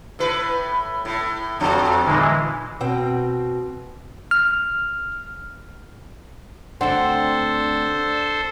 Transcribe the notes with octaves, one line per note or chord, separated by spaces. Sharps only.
A2 B4
A2
F2 F3 D4
A#2 D3 E3 G#3
B2 C4 G5
F6
D2 C4 D4 A4 C5 F#5